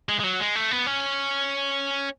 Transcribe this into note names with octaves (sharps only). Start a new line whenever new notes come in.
G#3
G#3
F#3
G#3
A3
B3
C#4